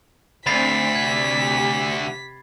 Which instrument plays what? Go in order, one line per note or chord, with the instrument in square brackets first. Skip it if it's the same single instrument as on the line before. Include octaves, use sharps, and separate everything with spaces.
[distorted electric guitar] D2 [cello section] A3 C4 D4 [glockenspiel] B5 A6 C7 [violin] B6
[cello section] C3 G4 [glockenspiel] G#6